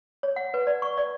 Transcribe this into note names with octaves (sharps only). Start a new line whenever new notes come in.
C#5
F#5
B4
D5
C#6
D5